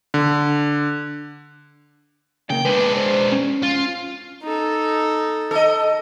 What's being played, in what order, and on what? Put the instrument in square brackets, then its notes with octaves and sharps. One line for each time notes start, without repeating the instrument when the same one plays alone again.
[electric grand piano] D3
[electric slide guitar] C#3 A#3 [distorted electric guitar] G5
[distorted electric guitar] G#3 D4 [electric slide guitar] B4
[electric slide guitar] C5
C#4
[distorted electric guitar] F4
[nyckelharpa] D#4 A4
[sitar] A4 D#5